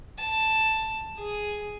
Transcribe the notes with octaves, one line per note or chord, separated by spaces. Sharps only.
A5
G#4